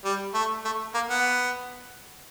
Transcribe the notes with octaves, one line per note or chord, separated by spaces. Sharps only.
G3
A3
A3
A#3
B3